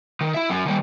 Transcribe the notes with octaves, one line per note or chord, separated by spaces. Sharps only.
D#3
E4 E5
F#3 C#4
D#3 G3